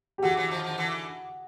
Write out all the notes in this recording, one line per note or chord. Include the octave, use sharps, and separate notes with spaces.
G4
D3 E3 F#4 G#4
E3 F#3
D#3 F3
D#3 F3
D3 E3